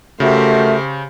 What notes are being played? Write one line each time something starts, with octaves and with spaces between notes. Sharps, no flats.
C#3 A3 F#4 G4 A#4 C5 E5